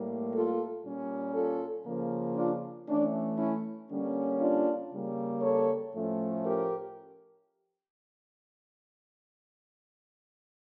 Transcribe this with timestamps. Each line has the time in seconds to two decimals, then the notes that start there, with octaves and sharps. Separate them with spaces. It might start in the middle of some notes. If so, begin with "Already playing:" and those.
Already playing: A2 G3 A#3
0.33 F4 A4
0.85 A#2 G3 C#4
1.34 F4 A4
1.86 C#3 F3 A#3
2.36 D4 F4
2.88 E3 A3 C#4 D4
3.39 C#4 E4
3.90 D3 G3 A#3 C#4
4.40 D4 F4
4.91 C#3 G3 A#3
5.42 A4 C#5
5.93 A2 F3 A3 C#4
6.45 G4 A#4